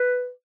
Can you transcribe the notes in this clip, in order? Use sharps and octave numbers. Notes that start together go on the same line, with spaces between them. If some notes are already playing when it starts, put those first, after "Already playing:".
Already playing: B4